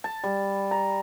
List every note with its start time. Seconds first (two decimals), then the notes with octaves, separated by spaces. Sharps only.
0.04 A5
0.24 G3
0.71 A#5